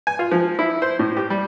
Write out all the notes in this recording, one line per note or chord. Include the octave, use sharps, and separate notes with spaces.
G#5
F4
F3
E4
C5
A2
G4
G3